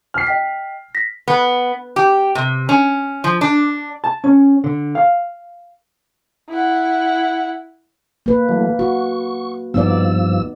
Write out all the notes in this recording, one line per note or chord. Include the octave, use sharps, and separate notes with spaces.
F6 C7
D#5 G5 B6
A#6 B6
B3
G4
C3
C#4
F3
D4
A5
C#4
D3
F5
E4 F#5
A#3 B4
E3 F#3 A3
F#4 C#6
G2 F3 B3 D#4 D5 E6